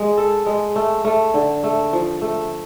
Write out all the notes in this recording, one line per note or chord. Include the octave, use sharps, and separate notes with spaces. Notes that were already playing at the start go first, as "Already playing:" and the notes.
Already playing: G#3
A4
G#3
A3
A3
D3
A3
F3
A3